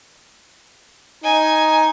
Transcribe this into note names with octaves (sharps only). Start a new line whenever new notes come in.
D#4 G#5